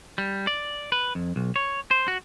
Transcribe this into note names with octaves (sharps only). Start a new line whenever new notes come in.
G3
D5
B4
F2
B1
C#5
C5
F#4